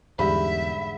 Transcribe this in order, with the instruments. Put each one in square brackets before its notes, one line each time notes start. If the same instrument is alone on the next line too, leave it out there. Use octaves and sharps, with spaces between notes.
[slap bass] E2 [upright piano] G#2 D3 G3 [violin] E5 [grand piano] B5